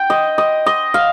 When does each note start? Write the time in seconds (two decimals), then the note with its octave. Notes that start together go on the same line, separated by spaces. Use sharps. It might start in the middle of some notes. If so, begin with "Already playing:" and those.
Already playing: G5
0.10 D#5
0.38 D#5
0.66 D#5
0.94 F5